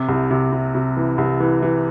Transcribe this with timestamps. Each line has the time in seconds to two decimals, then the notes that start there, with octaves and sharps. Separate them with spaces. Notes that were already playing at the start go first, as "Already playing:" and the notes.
Already playing: C3
0.09 C2
0.31 C3
0.52 C3
0.75 C3
0.97 E3
1.18 C2
1.40 E3
1.62 E3